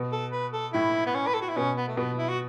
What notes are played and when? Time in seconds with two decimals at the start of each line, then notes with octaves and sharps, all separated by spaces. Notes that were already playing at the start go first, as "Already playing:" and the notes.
Already playing: B2
0.12 A4
0.32 B4
0.53 A4
0.73 A2 E4
1.07 B3
1.14 C#4
1.27 B4
1.34 A4
1.41 F#4
1.49 E4
1.56 B2 C#4
1.77 B3
1.88 A3
1.97 B2 B3
2.18 E4
2.29 F#4